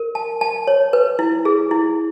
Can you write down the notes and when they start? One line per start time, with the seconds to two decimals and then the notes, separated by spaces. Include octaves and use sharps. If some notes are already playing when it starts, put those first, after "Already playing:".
Already playing: A#4
0.15 A5
0.41 A5
0.67 C#5
0.93 B4
1.19 E4
1.45 G#4
1.71 E4